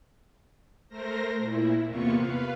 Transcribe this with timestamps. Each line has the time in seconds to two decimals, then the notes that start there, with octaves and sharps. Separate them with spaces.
0.89 A3 A#4 C5 A#6
1.38 A#2 E4
1.86 E2 C3 A#3 B3 F4 C#6
2.16 B4 F5